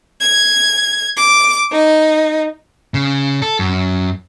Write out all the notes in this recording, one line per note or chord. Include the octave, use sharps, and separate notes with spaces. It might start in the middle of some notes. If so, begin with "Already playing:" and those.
G#6
D6
D#4
C#3
A4
F#2